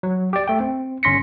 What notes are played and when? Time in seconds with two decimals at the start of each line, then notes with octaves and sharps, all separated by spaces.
0.03 F#3
0.33 G4 D5
0.48 A3 G5
0.60 C4
1.03 G1 C#4 C6 A#6 B6 C#7